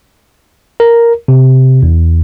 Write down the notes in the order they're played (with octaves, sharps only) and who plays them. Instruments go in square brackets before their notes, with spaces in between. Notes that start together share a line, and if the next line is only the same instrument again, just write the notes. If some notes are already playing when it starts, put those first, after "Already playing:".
[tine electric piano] A#4
C3
E2